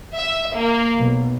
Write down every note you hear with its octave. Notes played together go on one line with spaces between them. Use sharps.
E5
A#3
B1